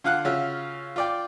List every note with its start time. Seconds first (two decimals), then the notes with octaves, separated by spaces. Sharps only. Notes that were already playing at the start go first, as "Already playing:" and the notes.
0.04 D3 F4 F5 F#5 F#6
0.25 C#3 C#4 F4 F#4 E5 F5
0.96 F4 D5 G5